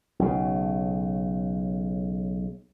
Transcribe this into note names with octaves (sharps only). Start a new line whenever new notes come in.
B1 C#3